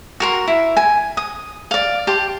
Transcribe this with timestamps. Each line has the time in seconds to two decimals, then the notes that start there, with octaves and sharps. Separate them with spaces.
0.20 F#4 A#4 C6
0.47 E4
0.77 G#5
1.17 D#6
1.71 D5 F5
2.07 G4 A5 C6